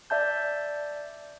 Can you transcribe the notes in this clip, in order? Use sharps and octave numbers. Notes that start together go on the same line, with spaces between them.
D5 E5 A5 G6